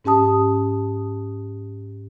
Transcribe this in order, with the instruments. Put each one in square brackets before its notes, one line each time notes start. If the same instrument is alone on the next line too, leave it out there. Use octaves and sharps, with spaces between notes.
[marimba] G#2 C#4 G4 A5 D#6